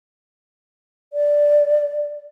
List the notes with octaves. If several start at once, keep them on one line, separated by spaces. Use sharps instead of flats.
D5